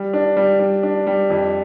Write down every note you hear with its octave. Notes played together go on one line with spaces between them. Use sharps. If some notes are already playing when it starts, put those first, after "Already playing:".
Already playing: G3
D4
G3
G3
D4
G3
F2